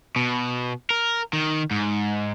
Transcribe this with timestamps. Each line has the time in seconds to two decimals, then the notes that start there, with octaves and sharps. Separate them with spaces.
0.16 B2
0.90 A#4
1.33 D#3
1.71 G#2